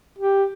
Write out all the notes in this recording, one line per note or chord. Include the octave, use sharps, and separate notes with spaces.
G4